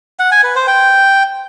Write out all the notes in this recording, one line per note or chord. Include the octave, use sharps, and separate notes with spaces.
F#5
G#5
B4
C5
G5